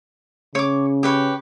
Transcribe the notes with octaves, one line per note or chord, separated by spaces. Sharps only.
C#3 C#5 D6
G4 B4 C#5